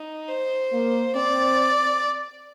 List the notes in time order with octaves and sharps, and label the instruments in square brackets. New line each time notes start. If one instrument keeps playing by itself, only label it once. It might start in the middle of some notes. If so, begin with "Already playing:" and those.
Already playing: [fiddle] D#4
C5
[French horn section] A#3
[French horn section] C4 [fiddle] D5